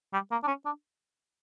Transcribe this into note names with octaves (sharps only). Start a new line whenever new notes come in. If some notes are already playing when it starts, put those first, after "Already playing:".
G3
A#3
D4
C#4
D4